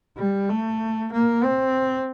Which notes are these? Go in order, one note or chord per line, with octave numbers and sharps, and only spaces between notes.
G3
A3
A#3
C4